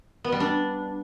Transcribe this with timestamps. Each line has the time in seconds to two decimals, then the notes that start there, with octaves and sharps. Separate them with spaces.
0.24 B3
0.32 G3
0.40 D4